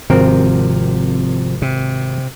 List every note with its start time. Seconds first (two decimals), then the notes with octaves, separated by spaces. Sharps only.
0.10 G#1 C3 F3 C4 A#4
1.62 C3